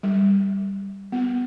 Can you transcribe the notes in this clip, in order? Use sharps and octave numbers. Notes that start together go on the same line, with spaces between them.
G3
B3